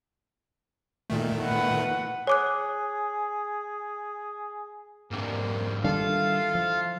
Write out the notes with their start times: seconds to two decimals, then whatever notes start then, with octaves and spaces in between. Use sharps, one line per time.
1.10 A#2 D#3 A3
1.42 B4 F#5
2.27 G#4 C#5 D6 F#6
5.11 G#2 C3 A#3 D4
5.84 D#3 G3 D4 E4 F4 A4 F5
6.55 F3 F4